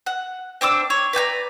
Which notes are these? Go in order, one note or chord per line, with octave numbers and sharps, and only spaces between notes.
F#5
C4 D4 D6 E6
C#5
B4 D5 G5 A#5